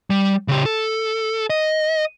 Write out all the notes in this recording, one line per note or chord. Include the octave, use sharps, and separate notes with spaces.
G3
C#3 G4
A4
D#5